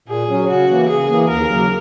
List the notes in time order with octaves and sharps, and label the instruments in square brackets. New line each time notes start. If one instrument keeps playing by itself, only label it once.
[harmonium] A#2 [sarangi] G#4
[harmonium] F#3 C#4
[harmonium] C#3 [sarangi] F#4
[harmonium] E3 A#3
[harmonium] C#3 [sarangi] G#4
[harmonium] E3 A#3
[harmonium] D#2 [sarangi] A#4
[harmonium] C#3 F#3 A#3